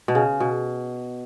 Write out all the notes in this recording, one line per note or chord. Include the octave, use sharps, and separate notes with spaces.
B2
C#3
B2